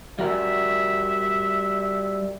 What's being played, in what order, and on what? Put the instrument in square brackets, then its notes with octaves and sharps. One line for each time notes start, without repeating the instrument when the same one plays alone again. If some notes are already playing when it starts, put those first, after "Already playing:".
[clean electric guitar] G3 F#4 A#4 [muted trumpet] E5